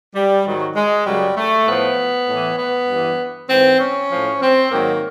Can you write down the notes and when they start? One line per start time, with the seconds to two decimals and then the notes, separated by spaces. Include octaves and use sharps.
0.14 G3
0.45 G#2 D#3 F#3
0.75 G#3
1.05 F#2 C#3 F#3 G3
1.35 A3
1.66 A2 F3 B3
2.27 A2 E3
2.58 B3
2.88 G2 E3
3.49 G#2 E3 C4
3.80 C#4
4.11 A2 F3
4.41 C4
4.71 G#2 D#3 F#3 A#3